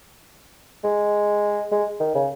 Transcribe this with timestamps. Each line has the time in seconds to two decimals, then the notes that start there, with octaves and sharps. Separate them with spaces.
0.84 G#3
1.71 G#3
2.00 D#3
2.15 C#3